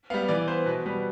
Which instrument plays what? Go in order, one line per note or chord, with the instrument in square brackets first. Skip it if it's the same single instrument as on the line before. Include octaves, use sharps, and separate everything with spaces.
[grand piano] G3 B3 F5
E3 D5
B3 C5
B2 B4
G3 B3 B4